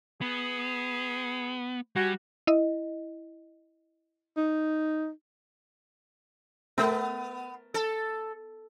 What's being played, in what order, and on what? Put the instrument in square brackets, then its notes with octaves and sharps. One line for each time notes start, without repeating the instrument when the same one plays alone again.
[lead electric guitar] B3 [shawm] G#4
[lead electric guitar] G3 [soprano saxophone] F#4 [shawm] G#5
[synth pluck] E4 D#5
[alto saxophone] D#4
[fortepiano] A3 A#4 E5 [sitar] B3
[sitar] A4